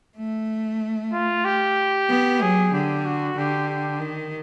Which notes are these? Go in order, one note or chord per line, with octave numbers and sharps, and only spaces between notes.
A3
F4
G4
B3
F#3 G#4
D3 G4
F#4
D3 G4
G4
D#3